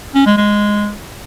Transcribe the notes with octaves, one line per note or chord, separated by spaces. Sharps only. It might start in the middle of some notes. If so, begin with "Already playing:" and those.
C#4
G#3
G#3